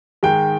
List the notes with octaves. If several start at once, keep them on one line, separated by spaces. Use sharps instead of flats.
G#2 D#3 G#3 G5